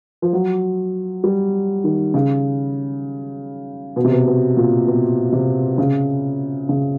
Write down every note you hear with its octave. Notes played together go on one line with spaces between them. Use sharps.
F3
F#3
G3
D#3
C#3
B2
C3
B2
B2
A#2
B2
C3
C#3
C#3